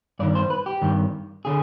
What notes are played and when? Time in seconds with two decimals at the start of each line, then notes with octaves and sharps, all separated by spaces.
0.19 G2 D#3 D5
0.35 C5
0.50 B4
0.66 G4
0.82 G2 D#3
1.45 D3 G#4